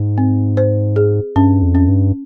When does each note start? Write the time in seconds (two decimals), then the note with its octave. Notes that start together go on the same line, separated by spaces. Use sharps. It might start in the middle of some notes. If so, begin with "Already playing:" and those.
Already playing: G#2 C5
0.18 C4
0.57 C5
0.96 G#4
1.36 G2 C#4
1.62 F2
1.75 C#4
1.88 G2